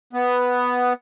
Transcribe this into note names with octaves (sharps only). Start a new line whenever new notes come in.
B3